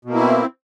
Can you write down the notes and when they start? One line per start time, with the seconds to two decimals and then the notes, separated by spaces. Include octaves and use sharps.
0.05 B2
0.10 A#3
0.15 E4
0.20 C4